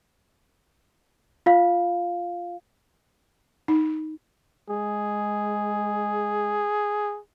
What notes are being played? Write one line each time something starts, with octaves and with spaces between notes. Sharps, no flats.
F4 F5
D#4
G#3 G#4